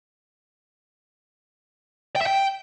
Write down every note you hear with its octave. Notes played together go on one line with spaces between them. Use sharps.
G5
E5
G5